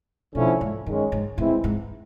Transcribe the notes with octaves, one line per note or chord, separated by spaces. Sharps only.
B2 D3 F3 A3 C#4 E4
G#2
G2 D#3 G#3 C#4
G#2
A2 E3 G#3 C4 E4
G#2